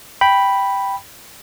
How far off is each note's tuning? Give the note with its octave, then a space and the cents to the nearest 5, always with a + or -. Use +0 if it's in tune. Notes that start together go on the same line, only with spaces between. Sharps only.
G5 +0 B5 +0